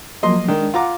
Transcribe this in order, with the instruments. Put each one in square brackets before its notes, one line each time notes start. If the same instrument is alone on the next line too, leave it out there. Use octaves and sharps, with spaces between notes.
[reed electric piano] F3 F#3 A#3 [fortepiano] D#5 C6
[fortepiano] D#3 [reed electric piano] G#3 D4
[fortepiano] F4 A#5 D6 [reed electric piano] F#5